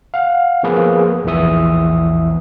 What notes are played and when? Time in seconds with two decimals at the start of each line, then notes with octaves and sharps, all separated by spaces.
0.14 F5 F#5
0.63 F3 A#3 B3 G#4 B4
1.25 A#1 E2 A#2 E3 E5 D#6